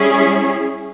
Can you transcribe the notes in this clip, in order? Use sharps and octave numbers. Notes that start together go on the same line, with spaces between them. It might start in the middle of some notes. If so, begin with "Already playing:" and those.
Already playing: G3 C#4 E4 G#4